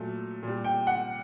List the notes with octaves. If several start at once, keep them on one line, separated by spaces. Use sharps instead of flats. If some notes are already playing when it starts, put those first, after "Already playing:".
Already playing: A#2 F#3 A3
A#2 G3
G5
F#5